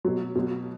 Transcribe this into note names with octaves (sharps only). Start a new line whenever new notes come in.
B2 F#3
B2 F#3